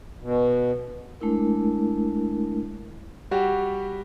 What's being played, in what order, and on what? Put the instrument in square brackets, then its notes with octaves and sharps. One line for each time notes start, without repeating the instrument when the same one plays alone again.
[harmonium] B2
[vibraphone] G#3 A3 D4 E4 A#4
[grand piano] G3 F#4 G4